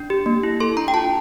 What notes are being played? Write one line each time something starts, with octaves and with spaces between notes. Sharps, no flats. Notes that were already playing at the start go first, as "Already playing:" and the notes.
Already playing: D4
G4
A#3
E4
A4 C6
D4 A#5
G5
F4 A5